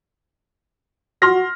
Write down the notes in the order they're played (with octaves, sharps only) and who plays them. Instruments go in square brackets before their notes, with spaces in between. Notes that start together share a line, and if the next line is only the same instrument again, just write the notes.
[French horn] F#4 [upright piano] C6 F6 A#6